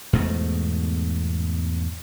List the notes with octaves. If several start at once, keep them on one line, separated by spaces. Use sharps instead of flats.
E2 G#2 B2 A3